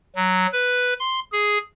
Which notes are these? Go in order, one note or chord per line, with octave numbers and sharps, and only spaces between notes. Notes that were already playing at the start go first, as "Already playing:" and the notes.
F#3
B4
C6
G#4